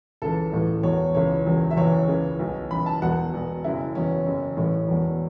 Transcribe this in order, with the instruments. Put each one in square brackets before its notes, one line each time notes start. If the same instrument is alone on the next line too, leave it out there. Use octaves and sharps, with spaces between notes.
[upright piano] C#2 C#3 E3 A4
A1 A2 E3
E1 E2 B2 C#5
C#2 C#3 E3 C#5
E1 E2 C#3
E5
F#1 E2 E3 C#5
C#2 C#3 E3
B1 B2
F#1 F#2 E3 B5
A5
E1 E2 B2 F#5
E1 E2 B2
F#1 F#2 C#3 E4
F#1 E2 B2 C#4
F#1 F#2 C#3
A1 A2 E3 C#4
E1 E2 B2